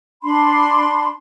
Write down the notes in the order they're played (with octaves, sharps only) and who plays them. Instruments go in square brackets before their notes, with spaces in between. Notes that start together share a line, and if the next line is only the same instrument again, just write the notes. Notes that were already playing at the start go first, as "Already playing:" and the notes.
[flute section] D4 B5 C6